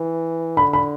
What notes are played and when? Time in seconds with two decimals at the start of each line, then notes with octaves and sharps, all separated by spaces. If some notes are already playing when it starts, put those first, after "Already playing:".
Already playing: E3
0.57 D3 B5
0.73 B5